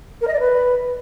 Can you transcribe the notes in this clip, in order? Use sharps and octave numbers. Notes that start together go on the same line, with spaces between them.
A#4
D#5
D5
B4